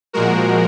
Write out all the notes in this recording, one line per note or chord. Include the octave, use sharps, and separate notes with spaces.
A#2 F3 G#3 F#4 A#4